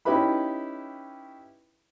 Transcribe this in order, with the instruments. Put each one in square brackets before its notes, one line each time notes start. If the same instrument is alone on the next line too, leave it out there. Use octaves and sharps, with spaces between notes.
[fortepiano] C#4 D#4 E4 G4 B4 B5